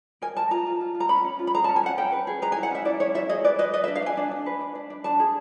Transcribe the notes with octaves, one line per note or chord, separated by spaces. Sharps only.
A#4 G#5
A#4 A5
F4 A#5
F4
F4
F4
A#5
C#4 B5
C#4
F4
B5
G#4 A#5
A5
C#4
G#5
C#4 F#5
C#4 G5
B4
G#4
B4 A#5
G#5
E4
F#5
C#4 E5
E4 D5
E4 C#5
E4 E5
G#4 D#5
B4 D5
B4 D#5
B4 D#5
E5
D4
F5
D4 G#5
D4
D4
B4
D4
D4
D4
D4 A5
G#4